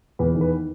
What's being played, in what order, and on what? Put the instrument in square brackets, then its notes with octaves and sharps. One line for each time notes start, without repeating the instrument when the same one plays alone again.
[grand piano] E2 B4
D#3
B4